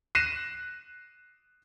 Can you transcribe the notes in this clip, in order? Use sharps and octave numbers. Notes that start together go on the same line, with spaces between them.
F#6 A#6 C7 D#7 E7